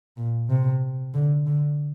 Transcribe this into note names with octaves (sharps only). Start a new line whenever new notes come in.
A#2
C3
D3
D3